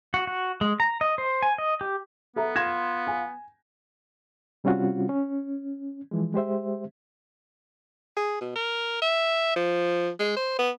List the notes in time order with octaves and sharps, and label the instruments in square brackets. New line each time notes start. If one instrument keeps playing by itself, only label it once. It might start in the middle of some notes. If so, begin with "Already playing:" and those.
[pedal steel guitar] F#4
F#4
G#3
A#5
D#5
C5
G#5
D#5
G4
[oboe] B3 [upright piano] A4 E5 A#5
[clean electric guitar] F4 [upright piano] G#6 A#6 E7
[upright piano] G#5
[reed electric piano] C3 G3 C4 C#4 F4 F#4
C#4
E3 F3 G#3
G#3 G4 C5 E5
[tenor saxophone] G#4
B2
A#4
E5
F3
G#3
C5
B3